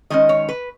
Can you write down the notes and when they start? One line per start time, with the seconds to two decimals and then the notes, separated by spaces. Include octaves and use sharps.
0.10 D#3 G#3 C#4 D#5
0.29 C#5
0.49 B4